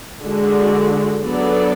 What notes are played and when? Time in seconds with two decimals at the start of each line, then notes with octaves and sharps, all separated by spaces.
0.22 D3 G#3 D4 F#4
1.22 F#3 B3 D4 A4 D5